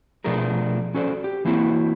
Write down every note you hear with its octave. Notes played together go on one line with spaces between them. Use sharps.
B2 F3 A3 D4 G#4 A#4
C#4 F#4 A4 C5 D5
G4
E3 A#3 C4 E4 F#4 C#5